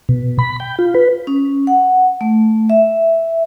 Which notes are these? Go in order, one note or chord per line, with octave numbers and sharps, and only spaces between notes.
B2
B5
G5
F4
B4
C#4
F#5
A3
E5